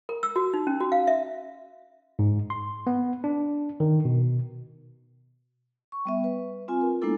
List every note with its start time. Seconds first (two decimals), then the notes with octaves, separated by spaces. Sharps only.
0.09 A#4
0.23 E6
0.36 F#4
0.54 D#4
0.67 C#4
0.80 F#4
0.92 F5
1.07 E5
2.19 G#2
2.50 C6
2.87 B3
3.24 D4
3.80 D#3
4.05 B2
5.92 C#6
6.05 G3 B3 E5
6.24 B4
6.68 C4 F4 G#5
6.81 A#4
7.02 G#3 A#3 B3 D4 E4 A4